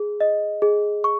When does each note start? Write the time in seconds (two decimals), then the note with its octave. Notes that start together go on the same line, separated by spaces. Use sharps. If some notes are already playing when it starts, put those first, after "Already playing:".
Already playing: G#4
0.21 D#5
0.62 G#4
1.04 C#6